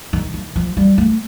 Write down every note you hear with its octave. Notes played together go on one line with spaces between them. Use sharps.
D#3
D#3
F3
G3
A3